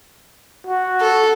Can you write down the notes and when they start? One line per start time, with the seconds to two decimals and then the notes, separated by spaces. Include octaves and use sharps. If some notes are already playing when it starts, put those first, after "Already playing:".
0.67 F#4
1.01 A4